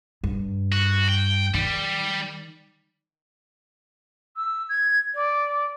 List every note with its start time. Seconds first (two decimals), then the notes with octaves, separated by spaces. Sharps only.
0.24 G2
0.72 F#4
1.09 G5
1.54 D#3 G3
4.36 E6
4.69 G#6
5.14 D5